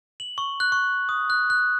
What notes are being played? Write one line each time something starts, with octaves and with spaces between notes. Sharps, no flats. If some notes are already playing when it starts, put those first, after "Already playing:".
F#7
C#6
F#6
C#6
D#6
F#6
F#6